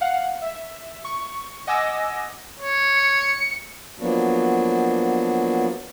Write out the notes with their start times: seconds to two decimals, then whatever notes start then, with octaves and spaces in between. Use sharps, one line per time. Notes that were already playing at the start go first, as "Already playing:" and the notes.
0.01 F5 F#5
0.42 E5
1.05 C#6
1.67 D#5 F#5 G#5 D6 E6 A#6
2.60 C#5
2.96 C#7
4.00 F3 F#3 A#3 B3 D4 F#4